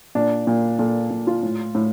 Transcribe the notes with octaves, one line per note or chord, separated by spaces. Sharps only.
A#2 D4
A#2
A#2 A4
A#2
F4
A2
A2